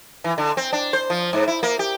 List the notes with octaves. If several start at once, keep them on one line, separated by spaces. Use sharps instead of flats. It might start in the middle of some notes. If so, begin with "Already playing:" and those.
E3
D3
C4
D4
C5
F3
G#2
E4
A#3
G4